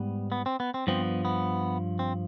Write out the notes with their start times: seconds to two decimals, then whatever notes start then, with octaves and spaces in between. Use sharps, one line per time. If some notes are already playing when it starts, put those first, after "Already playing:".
Already playing: G#2 G3 B3
0.32 B3
0.46 C4
0.60 B3
0.74 C4
0.87 G2 F3 B3 C4
1.25 B3
1.99 C4